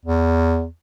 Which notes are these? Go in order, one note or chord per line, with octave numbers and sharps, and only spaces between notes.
E2